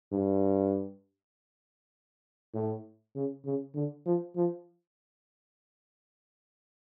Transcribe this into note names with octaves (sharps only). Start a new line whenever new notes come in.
G2
A2
C#3
C#3
D3
F3
F3